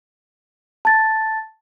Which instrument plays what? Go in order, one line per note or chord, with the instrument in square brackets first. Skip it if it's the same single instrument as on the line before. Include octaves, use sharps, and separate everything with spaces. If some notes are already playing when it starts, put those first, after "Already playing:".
[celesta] A5 A6